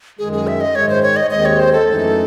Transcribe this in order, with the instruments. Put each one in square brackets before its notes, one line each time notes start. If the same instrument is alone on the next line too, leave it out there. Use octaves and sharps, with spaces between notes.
[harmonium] F#2 D#3 G#3 [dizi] G#4
[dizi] G#4
E5
D#5
[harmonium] G#2 D#3 G#3 [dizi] C#5
[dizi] C5
C#5
D#5
[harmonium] D#2 D#3 G#3 C4 [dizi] D#5
[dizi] C#5
C5
A4
[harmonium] F#2 E3 A3 D#4